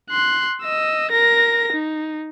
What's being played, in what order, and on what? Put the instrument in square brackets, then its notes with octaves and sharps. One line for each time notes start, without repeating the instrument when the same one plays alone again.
[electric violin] C6 F#6
D#5 E6
A#4 A#6
D#4